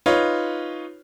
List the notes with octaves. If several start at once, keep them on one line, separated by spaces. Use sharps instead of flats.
D#4 F4 B4 C#5